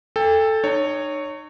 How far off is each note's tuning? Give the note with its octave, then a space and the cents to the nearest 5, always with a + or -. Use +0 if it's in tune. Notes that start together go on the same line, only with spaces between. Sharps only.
A4 +0 G5 +35
D#4 -40 C#5 +0